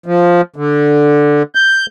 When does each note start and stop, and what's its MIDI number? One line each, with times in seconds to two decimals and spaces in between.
0.06 0.41 53
0.56 1.43 50
1.55 1.86 91